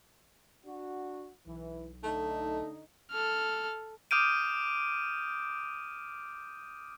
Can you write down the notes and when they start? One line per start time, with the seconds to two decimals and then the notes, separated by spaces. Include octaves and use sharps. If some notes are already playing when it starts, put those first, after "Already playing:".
0.66 D4 F#4
1.46 B1 E3
2.04 D3 A3 D#4
3.11 A4 F6
4.11 D6 D#6 F6 G6 D7 D#7